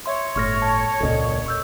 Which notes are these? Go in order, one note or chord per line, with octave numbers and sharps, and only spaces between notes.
C#5 E5 C6
G1 A2 C#6 F6 A#6
A5
E1 C#2 A#2 A4 D#5
C#6 E6 G6